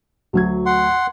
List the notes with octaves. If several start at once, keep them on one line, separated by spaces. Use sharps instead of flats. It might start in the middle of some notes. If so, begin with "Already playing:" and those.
D2 F#3 G#6
F#5 C6